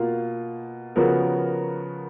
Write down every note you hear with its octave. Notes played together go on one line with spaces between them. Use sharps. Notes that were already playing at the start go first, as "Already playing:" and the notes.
Already playing: B2 A#3 F4
C#3 F3 B3 F#4 A#4